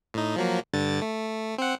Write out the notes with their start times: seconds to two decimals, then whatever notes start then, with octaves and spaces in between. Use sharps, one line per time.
0.14 A2 D#4
0.36 F3 F#3 A#3
0.73 G2 D3 A6
1.02 A3
1.58 C4 F#5